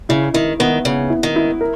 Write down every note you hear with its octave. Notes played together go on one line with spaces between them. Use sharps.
C#3 E4
D#3 E4
D#3 B3
C#3 B3
E4
D#3
E4
A#4